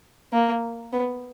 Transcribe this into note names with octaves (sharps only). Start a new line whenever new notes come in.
A#3
B3